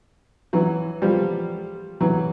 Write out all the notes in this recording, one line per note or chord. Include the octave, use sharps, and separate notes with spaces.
E3 F#3
F3 G3
E3 F#3